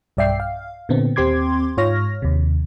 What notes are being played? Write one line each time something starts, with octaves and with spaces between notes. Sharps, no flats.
B1 G2 D5 E5 G5 C7
F5
A#2 D3 B3 C4
D#2 C4 G4 C6 D6 G#6
G#2 F4 C#5 F6 A#6
D#2 C3